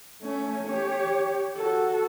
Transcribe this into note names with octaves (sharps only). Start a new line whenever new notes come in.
A3 C#4
G4 C#5
F#4 A4